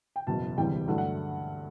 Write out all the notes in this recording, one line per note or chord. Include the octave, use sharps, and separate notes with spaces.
G5
F#1 E2 B2 A5
E1 D2 C3 E3 G3 G5
G2 D3 F#3 A3 F#5
F#5